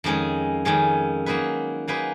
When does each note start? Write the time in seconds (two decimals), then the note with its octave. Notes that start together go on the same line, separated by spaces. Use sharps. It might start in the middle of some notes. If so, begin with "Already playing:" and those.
0.04 F2 D#3 G#3 C#4 G#4
0.65 F2 D#3 G#3 C#4 G#4
1.26 F#3 A#3 D#4 G#4 B4
1.88 F#3 A#3 D#4 G#4 B4